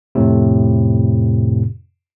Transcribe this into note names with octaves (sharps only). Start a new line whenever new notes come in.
F2 A2 C3